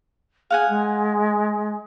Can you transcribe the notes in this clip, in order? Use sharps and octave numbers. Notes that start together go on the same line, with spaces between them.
G#4 F5 F#5 G#5
G#3